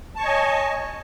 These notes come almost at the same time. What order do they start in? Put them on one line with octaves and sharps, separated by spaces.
A5 C#6 C#5 D#5 G#5